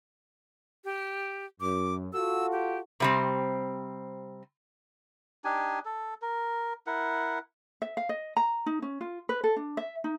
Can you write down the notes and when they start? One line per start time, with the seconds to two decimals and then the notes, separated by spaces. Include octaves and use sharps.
0.85 G4
1.61 F#2 D6
2.13 F4 F#4 A4 E6
2.52 G4
3.00 C3 G3 C4
5.44 D4 D#4 G4 G#5
5.85 A4
6.22 A#4
6.87 E4 A#4 F#5
7.82 E5
7.97 F5
8.09 D#5
8.37 A#5
8.66 D#4
8.82 C#4
9.01 F4
9.29 B4
9.44 A4
9.56 D4
9.77 E5
10.04 D#4